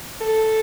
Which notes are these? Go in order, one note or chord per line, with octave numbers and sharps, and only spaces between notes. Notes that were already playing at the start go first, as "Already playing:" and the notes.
A4